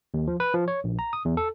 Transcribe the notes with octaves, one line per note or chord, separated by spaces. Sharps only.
D#2
F3
B4
F3
C#5
A#1
A#5
D#6
E2
A4